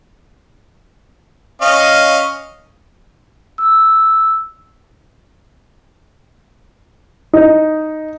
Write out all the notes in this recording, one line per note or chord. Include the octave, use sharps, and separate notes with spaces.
C#4 D#5 F5
E6
D#4